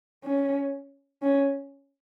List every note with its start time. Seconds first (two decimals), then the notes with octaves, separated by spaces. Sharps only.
0.24 C#4
1.22 C#4